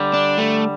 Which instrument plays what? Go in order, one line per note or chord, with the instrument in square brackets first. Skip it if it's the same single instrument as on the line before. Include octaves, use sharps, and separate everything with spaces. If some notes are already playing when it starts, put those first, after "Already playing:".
Already playing: [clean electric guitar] D3 G3
[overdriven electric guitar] D4
A3